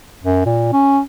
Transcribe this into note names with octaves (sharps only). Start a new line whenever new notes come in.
F#2
A#2
C#4